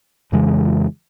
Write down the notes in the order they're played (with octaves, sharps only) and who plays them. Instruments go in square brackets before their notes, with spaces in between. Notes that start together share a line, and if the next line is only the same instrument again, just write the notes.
[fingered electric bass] F2 C#3 E3 G#3